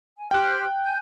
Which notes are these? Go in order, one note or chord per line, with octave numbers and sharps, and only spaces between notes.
G#5
G4 C5 G5 F6 F#6
G#5 G6